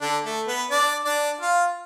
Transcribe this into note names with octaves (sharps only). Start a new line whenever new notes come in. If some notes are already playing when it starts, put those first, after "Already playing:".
D3 D4
A3 A4
B3 B4
D4 D5
D4 D5
F4 F5